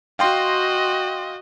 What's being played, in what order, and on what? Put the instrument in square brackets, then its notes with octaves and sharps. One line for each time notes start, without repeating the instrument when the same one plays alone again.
[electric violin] F#4 D#5 [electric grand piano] F5 G5 C6